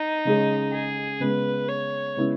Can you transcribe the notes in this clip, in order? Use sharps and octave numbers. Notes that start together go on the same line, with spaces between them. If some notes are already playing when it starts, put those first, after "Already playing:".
Already playing: D#4
C#3 G#3 C#4 G#4
G#4
C#3 G#3 B3 B4
C#5
C#3 G#3 B3 E4